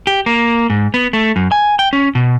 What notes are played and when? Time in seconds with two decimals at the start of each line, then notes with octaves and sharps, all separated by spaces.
0.07 G4
0.26 A#3
0.70 G#2
0.94 B3
1.13 A3
1.36 F#2
1.52 G#5
1.79 G5
1.93 C#4
2.15 B2